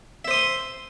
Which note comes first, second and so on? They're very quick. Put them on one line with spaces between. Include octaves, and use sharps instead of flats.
E5 C5 D#6 C6